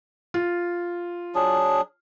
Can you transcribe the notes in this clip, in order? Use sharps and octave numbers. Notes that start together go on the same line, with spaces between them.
F4
F#3 D4 G#4